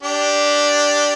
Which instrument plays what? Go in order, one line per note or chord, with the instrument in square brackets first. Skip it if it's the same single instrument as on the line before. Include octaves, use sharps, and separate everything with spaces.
[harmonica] D4 G4